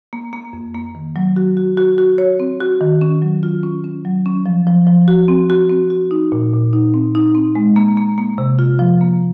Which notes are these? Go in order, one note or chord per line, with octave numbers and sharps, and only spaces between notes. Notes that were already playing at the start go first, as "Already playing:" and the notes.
A#3
A#3
F2
A#3
D#3
F#3
F#4
F#4
F#4
F#4
C#5
C4
F#4
D#3
C#4
F#3
F4
C#4
C#4
F#3
C#4
F3
F3
F3
F#4
C4
F#4
C4
F#4
D#4
A#2
A#2
D#4
C4
D#4
C4
G#3
A#3
A#3
A#3
C3
F4
F3
A#3